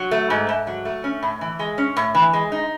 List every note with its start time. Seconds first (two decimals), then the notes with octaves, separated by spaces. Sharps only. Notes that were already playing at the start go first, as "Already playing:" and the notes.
Already playing: F#3
0.11 A3
0.30 G#2
0.49 G#2
0.67 F#3
0.85 A3
1.04 C#4
1.23 A2
1.41 E3
1.59 G#3
1.78 C#4
1.97 A2
2.15 E3
2.33 G#3
2.52 D#4